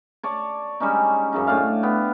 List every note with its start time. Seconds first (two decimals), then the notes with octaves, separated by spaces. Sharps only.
0.23 C#5 D5 A5
0.80 G3 G#3 C#4 D#4
1.32 F#2 C#3 D#4
1.47 A2 D4 F5
1.83 B3 G5